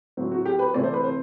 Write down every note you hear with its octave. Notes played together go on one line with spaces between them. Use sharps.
A2 F#3 C4
F#4
G4
B4
C3 E3 A3 C4 D5
C5
B4
C5